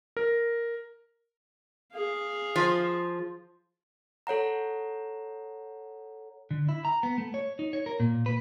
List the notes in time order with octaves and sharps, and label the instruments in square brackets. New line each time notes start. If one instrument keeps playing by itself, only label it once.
[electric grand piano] A#4
[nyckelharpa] G#4 F5
[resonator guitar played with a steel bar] F3
[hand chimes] A4 C#5 F#5 A#5
[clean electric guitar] D3
E4
A#5
B3
A3
C#5
D#4
C#5
A#4
A#2
B4